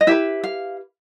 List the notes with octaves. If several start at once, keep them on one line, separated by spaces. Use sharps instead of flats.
D#5
E4 G4 B4 E5
F5